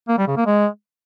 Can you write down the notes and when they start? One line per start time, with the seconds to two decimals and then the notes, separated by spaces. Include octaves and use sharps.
0.08 A#3
0.18 G3
0.27 C#3
0.37 A#3
0.46 G#3